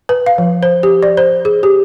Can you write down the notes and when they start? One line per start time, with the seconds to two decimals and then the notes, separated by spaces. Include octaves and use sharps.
0.09 B4
0.26 F5
0.38 F3
0.63 C5
0.83 G4
1.03 D5
1.17 C5
1.45 G#4
1.63 G4